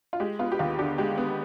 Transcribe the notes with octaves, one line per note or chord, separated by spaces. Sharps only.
F4
G#3 G4
B3 F4
G4
D#2 F4
D3 G4
G#3 G4
B3